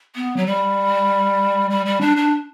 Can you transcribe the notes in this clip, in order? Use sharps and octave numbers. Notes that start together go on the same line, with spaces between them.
B3
F#3
G3
G3
G3
D4
D4